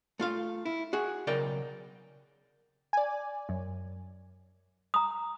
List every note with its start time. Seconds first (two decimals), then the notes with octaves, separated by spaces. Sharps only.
0.19 A3 F4 F5
0.66 E4
0.93 F#4 G#4
1.27 B1 C#3 A#4 D5 G5
2.93 D5 G#5
3.49 F#2
4.94 A#5 D#6